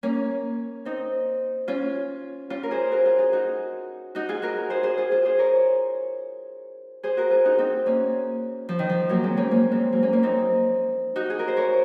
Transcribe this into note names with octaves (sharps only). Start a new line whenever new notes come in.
A#3 C#4
C4 D#4
C#4 F4
C#4 F4
A#4
G#4 C5
F#4 A#4
F4 G#4
F4 G#4
D#4 F#4
D#4 F#4
F4 G#4
F#4 A#4
G#4 C5
G#4 C5
F4 G#4
F4 G#4
G#4 C5
A#4 C#5
G#4 C5
F#4 A#4
F4 G#4
D#4 F#4
C4 D#4
A#3 C#4
F3
D#3
F3
F#3 A#3
G#3 C4
A#3 C#4
A#3 C#4
G#3 C4
F#3 A#3
A#3 C#4
A#3 C#4
C4 D#4
D#4 F#4
G#4
A#4
C5
A#4 C#5